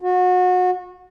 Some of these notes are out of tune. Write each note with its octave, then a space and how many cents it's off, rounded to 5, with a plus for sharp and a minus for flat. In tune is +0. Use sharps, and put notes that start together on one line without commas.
F#4 -30